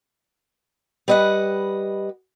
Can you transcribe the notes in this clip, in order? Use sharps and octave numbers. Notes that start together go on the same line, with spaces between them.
G3 B4 D#5 E5 F#5